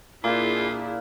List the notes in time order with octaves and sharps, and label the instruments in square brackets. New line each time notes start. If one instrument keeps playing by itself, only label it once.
[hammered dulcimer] A#2 [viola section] D4 E4 G#4 [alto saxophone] F4